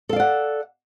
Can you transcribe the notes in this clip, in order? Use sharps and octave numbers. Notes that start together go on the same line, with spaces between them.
A4 D5 F5 F#5